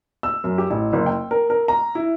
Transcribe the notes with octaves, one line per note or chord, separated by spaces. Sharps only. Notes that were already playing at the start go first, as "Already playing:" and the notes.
E6
F#2
G4
A1
F#1
G5
A#4
A#4
A#5
E4